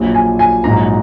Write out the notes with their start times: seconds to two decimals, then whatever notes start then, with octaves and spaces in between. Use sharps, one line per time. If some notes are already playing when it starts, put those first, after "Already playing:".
Already playing: A#1 A#2 F#3
0.15 G#5
0.39 G#5
0.64 A#1 G#2 F#3 A#5